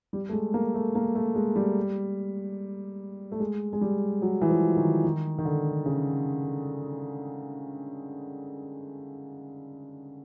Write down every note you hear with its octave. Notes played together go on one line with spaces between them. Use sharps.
G3
A3
G#3
A#3
A3
A#3
A3
G#3
G3
A3
G#3
G#3
G3
F#3
E3
F3
D#3
D#3
D#3
D3
C#3